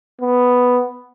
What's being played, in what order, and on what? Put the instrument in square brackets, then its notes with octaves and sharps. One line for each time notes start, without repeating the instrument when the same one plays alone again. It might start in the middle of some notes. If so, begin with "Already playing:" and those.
[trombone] B3